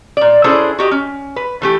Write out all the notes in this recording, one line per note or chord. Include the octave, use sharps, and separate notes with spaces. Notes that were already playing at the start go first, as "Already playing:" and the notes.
A#2 D5
C#4 D4 E4 G#4 A4 C5
F#4 G4 D#5
C#4
B4
E3 A3 G4